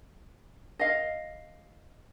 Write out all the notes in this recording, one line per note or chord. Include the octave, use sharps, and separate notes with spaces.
D#5 F5